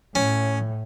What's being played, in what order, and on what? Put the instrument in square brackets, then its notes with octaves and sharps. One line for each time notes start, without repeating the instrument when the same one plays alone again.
[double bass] A2 [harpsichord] C#4